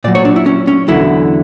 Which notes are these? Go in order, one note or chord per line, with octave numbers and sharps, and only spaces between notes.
A#2 F#3 D5
C#5
D4
E4
C#4
C#4
E2 D3 F#3 E4